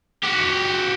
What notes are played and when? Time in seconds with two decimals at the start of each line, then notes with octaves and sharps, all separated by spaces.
0.23 F#4 G4